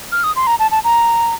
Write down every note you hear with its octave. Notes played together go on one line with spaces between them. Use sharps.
F6
D#6
C6
A#5
A5
A5
A#5